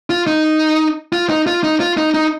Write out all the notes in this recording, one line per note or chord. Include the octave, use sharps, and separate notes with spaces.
F4
D#4
F4
D#4
F4
D#4
F4
D#4
D#4